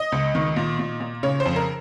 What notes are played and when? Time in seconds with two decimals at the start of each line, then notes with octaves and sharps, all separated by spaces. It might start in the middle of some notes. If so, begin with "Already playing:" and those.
Already playing: D#5
0.12 C#2
0.35 D#3
0.56 A#2
0.79 A#2
1.00 A#2
1.23 C#3 C#5
1.40 C5
1.46 F2
1.56 A#4